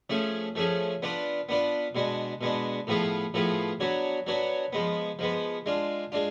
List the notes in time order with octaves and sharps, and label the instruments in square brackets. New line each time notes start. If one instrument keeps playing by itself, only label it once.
[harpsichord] F3 A3 C#4 G#4
F3 A3 C#4 G#4
B3 D4 F4 B4 D5
B3 D4 F4 B4 D5
B2 G#3 B3 D4
B2 G#3 B3 D4
A2 F3 B3 F4 G#4
A2 F3 B3 F4 G#4
F#3 B3 D4 F#4 C#5
F#3 B3 D4 F#4 C#5
F3 G#3 B3
F3 G#3 B3
G#3 D4 F4
G#3 D4 F4